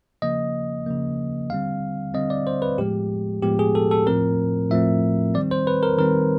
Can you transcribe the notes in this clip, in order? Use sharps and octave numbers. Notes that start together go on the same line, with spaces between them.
C#3 F3 A#3 D#5
C#3 F3 A#3
D3 G3 C4 F5
D3 G3 C4 D#5
D5
C5
B4
A2 F3 G#3 B3 G4
A2 F3 G#3 B3 G4
G#4
A4
A4
A2 F3 A3 C4 A#4
A2 F3 A3 C4 E5
D#3 G3 C4 D5
C5
B4
A#4
D#3 G3 C4 A#4